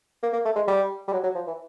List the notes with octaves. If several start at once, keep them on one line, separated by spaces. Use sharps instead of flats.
A#3
A#3
A3
G#3
G3
G3
F#3
F#3
F3
E3